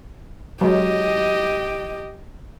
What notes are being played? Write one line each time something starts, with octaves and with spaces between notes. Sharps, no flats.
F#3 G#3 G4 D#5